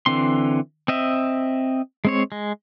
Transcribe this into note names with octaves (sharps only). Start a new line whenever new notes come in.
D3 E3 C4 C6
C4 D#5 E5
G#3 C4 C#5
G#3